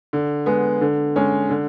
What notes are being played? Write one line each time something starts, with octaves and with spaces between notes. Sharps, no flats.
D3
G#3 B3
D3
G#3 C#4
D3